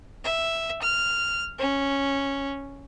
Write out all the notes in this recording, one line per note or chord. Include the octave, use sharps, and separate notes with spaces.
E5
F6
C#4